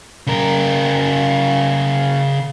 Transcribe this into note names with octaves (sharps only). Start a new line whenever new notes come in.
C#3 A#4